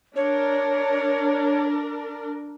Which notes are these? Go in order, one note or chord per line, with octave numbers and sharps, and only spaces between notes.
D4 A#4 C#5